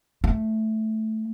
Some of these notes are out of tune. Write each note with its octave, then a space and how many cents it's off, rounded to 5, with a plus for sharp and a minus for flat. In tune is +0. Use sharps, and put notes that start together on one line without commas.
A3 -5